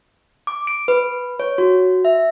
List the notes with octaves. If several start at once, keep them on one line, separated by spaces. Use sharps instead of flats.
D6
D7
B4
C#5
F#4
E5